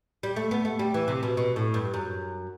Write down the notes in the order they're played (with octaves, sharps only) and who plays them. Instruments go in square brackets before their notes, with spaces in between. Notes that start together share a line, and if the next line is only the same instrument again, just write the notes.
[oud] G3
A3
B3
A3
G3
E3
C3
B2
B2
A2
G2
F#2